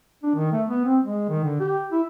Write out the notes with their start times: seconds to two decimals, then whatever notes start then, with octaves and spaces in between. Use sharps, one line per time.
0.23 D4
0.35 D#3
0.52 A3
0.68 B3
0.85 C4
1.03 G#3
1.29 D#3
1.44 D3
1.60 G4
1.91 E4